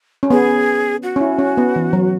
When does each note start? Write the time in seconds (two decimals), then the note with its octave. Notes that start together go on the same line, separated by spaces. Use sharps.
0.23 C#4
0.30 B3 G#4
1.03 F#4
1.16 C#4
1.21 E4
1.39 C#4
1.57 B3
1.76 E3
1.93 F#3